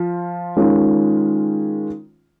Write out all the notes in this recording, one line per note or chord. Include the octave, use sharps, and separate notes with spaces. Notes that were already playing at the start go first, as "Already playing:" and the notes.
Already playing: F3 F4
D#3 G#3 C#4 F4